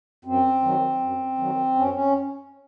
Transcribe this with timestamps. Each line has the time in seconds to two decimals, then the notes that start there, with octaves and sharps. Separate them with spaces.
0.25 F#2 C4
0.62 D#3 F#3
1.00 F#2
1.38 D#3 F#3
1.75 F#2 C#4
1.94 C#4